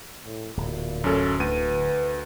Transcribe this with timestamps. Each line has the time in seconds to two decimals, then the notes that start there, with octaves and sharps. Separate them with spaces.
0.25 A2
0.57 D1 A#2
1.04 F#2 C#4 A4
1.40 D2 B4 D#7